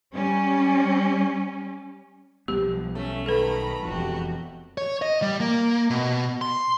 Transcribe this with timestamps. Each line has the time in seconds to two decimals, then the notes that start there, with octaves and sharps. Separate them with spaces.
0.13 G3 C#4
2.48 B1 F3 G3 B3 G4
2.95 A3 C#4
3.26 D#3 A4 B4 A#5 B5
3.85 E1 F2 F#4 G4
4.78 C#5
5.02 D#5
5.22 G3
5.40 A#3
5.90 B2
6.42 C6